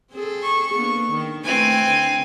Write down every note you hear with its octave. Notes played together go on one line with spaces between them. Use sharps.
C4 G#4 A4
C#6
A#3 B3 D4
D#3
A3 C4 E4 B4 G#5
D3